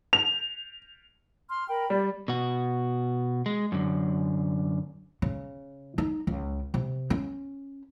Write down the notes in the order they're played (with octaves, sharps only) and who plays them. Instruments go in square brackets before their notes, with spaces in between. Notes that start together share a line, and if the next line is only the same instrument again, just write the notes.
[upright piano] F7
[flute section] C6 F6
A#4 G5 B5
[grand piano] G3 [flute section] D5
[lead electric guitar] B2 F#4
G#3
F#2 D3
[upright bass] C#3
D#4
C#2
C3
C#4